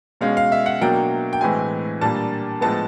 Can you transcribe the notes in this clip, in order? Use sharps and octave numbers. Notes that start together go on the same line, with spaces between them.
B2 G#3 C#4 F5
F5
E5
F#5
B2 F#3 A#3 D4 G5
G5
A2 E3 G#3 C4 G#5
A#2 G3 A#3 D4 A5
A2 F3 G#3 B3 A5